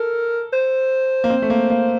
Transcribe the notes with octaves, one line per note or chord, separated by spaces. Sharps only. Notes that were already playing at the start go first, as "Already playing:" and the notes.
Already playing: A4 A#4
C5
A#3
C4
A3
A#3
A#3